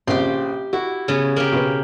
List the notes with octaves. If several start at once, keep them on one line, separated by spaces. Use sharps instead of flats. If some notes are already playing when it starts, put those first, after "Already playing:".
A#1 C#3 C4 G4 C6
E4 F#4
C#3 B3
A#3 G4
B2 B4